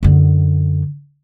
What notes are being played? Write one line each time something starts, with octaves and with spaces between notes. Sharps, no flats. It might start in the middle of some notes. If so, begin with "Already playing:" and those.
F#2 D3